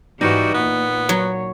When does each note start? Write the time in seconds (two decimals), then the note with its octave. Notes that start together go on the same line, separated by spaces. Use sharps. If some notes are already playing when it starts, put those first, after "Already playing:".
0.21 G#2 E3 G3 D#4 F#4
0.54 A#2 B3
1.09 F#3 C#5